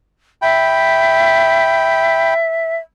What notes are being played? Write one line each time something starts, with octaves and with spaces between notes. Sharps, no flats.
E5 G5 B5